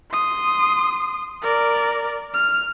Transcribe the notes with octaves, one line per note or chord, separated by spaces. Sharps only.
C6 D#6
A#4 D5
F6